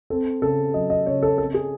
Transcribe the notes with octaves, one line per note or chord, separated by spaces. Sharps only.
C4 A4
C#3 A4
F#3 D#5
D#5
C#3 C#5
A4
C4 A4
G#4